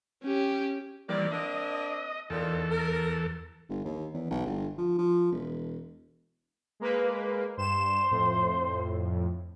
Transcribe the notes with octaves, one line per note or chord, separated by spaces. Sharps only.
C#4 G4
D#3 E3 G3 A#3 C4 D5
A#3 C4 D4 D#5
E2 A#2 D#3 A4
A#4
G1
D#2
E2
B1
G1
F3
F3
E1
G#3 A#3 B4
G2 C5 E7
F2 A2